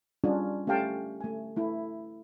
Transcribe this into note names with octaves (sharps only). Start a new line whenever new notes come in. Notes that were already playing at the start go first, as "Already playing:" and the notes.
G3 C#4 D4 F4 G#4
A3 C#4 G4 F5 G5 A5
A3 G#5
A3 E4